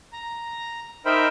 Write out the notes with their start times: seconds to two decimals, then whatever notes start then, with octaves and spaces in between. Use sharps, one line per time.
0.13 A#5
1.05 D#4 A#4 C5 E5 G5 B5